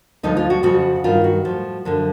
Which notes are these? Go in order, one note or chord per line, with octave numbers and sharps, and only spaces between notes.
D2 D3 F3 D#4
F4
F#4
F2 C#3 F3 F#4
G2 D#3 F4
F#4
A2 F3
F#2 D3 F3